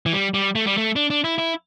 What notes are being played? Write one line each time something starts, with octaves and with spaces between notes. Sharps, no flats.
E3
G3
G3
A3
G3
A3
D4
D4
E4
E4